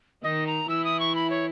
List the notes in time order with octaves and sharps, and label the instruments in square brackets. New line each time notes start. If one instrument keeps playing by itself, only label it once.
[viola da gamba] D#3 D#4 [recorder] D#5
[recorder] A#5
[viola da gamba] E3 E4 [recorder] E6
[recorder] D#6
C#6
B5
C#5